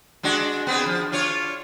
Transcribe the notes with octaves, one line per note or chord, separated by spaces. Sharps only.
G#3 D4 F#4
B3 C4 G#4
F3
D4 F4 C#5